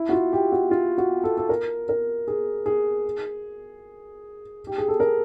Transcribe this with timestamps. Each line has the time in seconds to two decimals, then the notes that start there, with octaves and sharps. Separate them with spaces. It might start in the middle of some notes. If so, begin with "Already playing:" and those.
Already playing: E4
0.09 F#4
0.13 F4
0.33 G4
0.52 F#4
0.71 F4
0.98 F#4
1.24 A4
1.37 A4
1.49 A#4
1.89 A#4
2.28 G#4
2.66 G#4
4.67 G4
4.78 G#4
4.88 A4
5.00 A#4